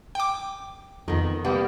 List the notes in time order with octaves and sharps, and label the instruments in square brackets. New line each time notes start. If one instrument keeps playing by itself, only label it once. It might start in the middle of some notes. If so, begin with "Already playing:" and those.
[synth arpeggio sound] G5 D6
[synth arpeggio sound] F2 [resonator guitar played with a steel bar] D#3 B3
[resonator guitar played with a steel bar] G3 A#3 B3